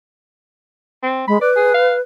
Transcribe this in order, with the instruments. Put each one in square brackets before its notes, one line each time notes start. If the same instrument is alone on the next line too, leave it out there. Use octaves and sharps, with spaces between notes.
[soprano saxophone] C4
[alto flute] G#3 [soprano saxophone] B5
[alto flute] B4 [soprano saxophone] D5
[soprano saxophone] G#4
F5